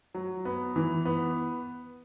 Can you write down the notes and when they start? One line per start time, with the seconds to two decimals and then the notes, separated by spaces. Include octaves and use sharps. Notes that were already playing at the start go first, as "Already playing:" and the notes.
0.14 F#3
0.45 B3
0.76 E3
1.05 B3